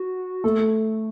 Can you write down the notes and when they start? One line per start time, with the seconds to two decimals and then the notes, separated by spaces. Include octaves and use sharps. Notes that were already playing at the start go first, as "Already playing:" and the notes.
Already playing: F#4
0.44 A3 A4